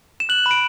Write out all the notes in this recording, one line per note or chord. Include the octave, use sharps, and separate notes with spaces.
E7
F#6 F#7
B5
D7